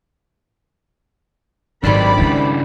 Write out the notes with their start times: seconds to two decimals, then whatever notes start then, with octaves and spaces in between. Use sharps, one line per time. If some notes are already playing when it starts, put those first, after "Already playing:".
1.84 G#1 G2 D#3 F#3 C4 D4 D5 B5
2.18 C#3 G#3 C#4 E4